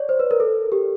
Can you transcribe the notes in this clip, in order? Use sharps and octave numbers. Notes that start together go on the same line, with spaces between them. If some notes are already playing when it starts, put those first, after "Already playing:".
Already playing: C#5 D5
C5
B4
A#4
A4
G4